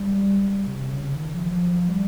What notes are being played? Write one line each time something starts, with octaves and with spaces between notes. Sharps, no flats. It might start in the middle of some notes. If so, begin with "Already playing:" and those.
Already playing: G3
G3
C3
C#3
D#3
F3
F3
F3
G3